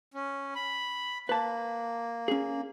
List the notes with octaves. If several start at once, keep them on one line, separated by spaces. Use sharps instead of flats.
C#4
B5
A#3 B4 A5
C#4 G#4